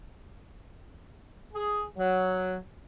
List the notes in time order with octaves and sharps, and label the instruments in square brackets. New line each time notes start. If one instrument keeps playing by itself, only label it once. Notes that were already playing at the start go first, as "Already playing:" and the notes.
[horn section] G#4
F#3